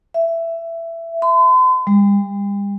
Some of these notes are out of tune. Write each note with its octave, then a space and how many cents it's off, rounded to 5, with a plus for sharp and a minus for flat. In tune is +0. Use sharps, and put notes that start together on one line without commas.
E5 +15
C6 -45
G3 +40